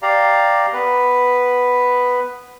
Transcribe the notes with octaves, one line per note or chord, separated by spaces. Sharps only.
G4 D5 F5 A#5
B3 B4